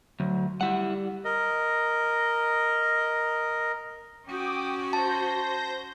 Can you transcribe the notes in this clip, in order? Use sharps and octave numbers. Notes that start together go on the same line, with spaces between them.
D2 F#3
G3 E4 F#5
A#4 D#5
C#4 F#4 G5 D6 D#6
C5 A5 G6 A#6